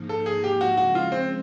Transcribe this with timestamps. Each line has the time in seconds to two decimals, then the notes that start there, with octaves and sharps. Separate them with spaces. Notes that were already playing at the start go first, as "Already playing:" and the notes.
Already playing: G#2 F3 A#3 D#4
0.09 A4
0.26 G#4
0.44 G4
0.61 F#4
0.77 C#3 F3 G#3 F#4
0.95 F4
1.12 C4